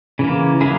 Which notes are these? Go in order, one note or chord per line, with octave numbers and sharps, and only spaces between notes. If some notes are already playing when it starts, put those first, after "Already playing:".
C#3 E3 A#3
F#3 A#3 E4 G#4